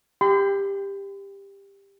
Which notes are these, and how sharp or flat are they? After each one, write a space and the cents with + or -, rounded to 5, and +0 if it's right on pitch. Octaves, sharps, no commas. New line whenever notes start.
G4 +15 C6 -45